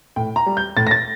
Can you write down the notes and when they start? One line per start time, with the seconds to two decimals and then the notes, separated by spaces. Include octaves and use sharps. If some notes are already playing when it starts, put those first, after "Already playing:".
0.16 A2 G5
0.36 A#5
0.46 G3
0.57 G6
0.77 A2 A6
0.87 A#6
0.91 A6